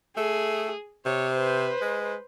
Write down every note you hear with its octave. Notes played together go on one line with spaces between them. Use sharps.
A3 G#4
C3 C#5
B4 C5
G#3